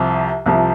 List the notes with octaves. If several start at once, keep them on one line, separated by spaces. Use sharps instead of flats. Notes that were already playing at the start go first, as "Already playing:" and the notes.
Already playing: C2 C3 F3
C2 C3 F3